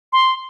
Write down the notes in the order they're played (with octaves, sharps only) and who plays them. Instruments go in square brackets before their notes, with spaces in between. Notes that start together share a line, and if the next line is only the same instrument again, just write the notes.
[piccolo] C6